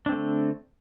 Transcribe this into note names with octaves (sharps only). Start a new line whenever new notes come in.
D3 A3 C4 D4